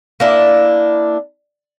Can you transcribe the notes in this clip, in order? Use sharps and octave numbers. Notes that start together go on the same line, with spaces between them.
A#3 D4 E4